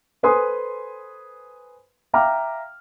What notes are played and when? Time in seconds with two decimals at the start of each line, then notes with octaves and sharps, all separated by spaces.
0.23 A4 B4 C5 G#5 C6 D#6
2.13 E5 F5 G5 A#5 D6 F6